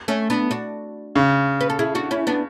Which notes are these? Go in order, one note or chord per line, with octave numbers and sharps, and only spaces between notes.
A3 C#4
B3 D4
D4 F#4
C#3
B4
A4
E4 G#4
D4 F#4
C#4 E4
B3 D4